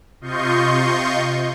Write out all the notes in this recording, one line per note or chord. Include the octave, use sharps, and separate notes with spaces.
C3 F4 D#5 C6 C#6 G6